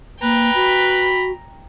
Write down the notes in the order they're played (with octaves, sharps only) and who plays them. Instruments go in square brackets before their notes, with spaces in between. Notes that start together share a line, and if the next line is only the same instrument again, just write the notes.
[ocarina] A#3 [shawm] B4 [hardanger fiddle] G5 A#5
[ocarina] F#4 [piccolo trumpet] B5